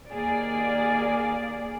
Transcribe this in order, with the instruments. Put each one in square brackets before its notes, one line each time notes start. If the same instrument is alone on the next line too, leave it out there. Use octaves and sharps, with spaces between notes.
[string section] D#2 A#3 G#4 D5